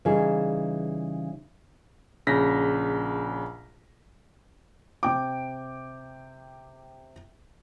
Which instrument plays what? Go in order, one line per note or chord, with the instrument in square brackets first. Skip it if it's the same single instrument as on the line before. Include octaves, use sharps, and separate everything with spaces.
[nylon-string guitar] C#3 E3 G3 D#4 G#4
[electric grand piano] A#1 C#3 A#6 B6
[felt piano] C3 G5 D6